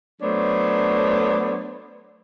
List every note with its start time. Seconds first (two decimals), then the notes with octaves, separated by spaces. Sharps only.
0.22 F#3 A3 B3 D4 C5 C#5